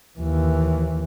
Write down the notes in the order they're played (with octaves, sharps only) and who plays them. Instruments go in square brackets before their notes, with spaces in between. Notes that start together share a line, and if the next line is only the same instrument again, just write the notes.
[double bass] D#2 E3